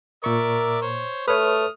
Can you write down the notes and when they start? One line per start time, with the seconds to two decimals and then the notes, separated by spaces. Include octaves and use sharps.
0.24 A#2 A#4 D5 E5 C#6
0.82 C5 C#5
1.28 A3 B4 C#5 D#6 F6